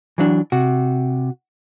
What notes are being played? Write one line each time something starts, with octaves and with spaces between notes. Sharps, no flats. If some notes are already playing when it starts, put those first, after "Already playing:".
E3 F#3 D4
C3 F#4